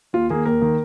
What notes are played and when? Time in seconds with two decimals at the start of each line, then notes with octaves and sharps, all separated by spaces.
0.13 D#2 F4
0.30 D#3 A#3 G#4
0.45 D#2 A#4
0.62 D#3 A#3